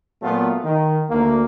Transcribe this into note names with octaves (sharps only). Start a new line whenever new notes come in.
A#2 F#3 A3 B3 F4
D#3
D2 A#3